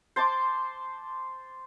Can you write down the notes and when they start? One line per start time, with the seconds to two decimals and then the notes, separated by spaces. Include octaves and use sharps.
0.16 C5 A5 C6 D6